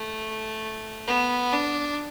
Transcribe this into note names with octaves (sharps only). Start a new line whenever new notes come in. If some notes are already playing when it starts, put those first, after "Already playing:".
Already playing: A3
B3
D4